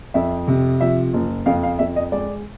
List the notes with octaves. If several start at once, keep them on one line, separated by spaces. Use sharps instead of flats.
F2 E5
C3
F3 E5
F#1
F2 F5
F5
F2 E5
D#5
G#3 D5